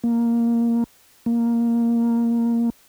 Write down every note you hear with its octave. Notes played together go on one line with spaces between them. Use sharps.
A#3
A#3